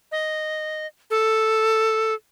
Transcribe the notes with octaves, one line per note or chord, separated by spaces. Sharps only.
D#5
A4